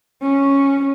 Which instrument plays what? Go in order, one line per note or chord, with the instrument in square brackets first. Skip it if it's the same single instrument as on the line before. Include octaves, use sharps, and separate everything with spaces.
[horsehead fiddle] C#4